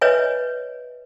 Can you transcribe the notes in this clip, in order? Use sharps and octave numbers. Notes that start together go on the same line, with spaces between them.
B4 C#5 D#5 E5 G#5